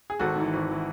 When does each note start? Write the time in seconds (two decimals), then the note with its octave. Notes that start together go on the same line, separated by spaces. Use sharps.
0.10 G#4
0.19 G#1 F#4 A4
0.36 G#2 E3
0.53 G#1
0.71 E3